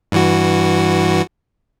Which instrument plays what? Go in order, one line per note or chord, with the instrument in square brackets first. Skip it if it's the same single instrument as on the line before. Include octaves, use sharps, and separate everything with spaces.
[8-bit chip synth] G2 E3 F#4